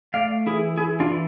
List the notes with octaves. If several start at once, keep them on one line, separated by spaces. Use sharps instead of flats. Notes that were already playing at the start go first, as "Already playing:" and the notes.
A3 D5 F5
E3 E4 G#4
E3 E4 G#4
D4 F4
E3